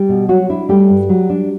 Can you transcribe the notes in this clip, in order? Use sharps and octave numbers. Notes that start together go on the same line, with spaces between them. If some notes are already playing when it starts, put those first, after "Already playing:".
Already playing: G3 G4
B2
F#3 F#4
D4 E4
G3 A3 G4
G2
F#3
D4